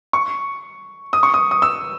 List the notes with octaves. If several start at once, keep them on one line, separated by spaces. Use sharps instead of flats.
C#6
D#6
C#6
D#6
D#6
E6